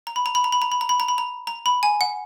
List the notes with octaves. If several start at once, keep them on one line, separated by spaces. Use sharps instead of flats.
A#5
B5
A#5
B5
A#5
B5
A#5
B5
A#5
B5
A#5
B5
A#5
A#5
B5
G#5
F#5